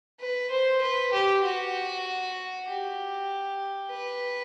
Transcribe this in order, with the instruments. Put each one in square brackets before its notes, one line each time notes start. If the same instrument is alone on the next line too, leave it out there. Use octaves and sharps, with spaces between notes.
[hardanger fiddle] B4
C5
B4
G4
F#4
G4
B4